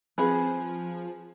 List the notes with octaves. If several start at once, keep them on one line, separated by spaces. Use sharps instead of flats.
F3 C4 G#4 B4 F#6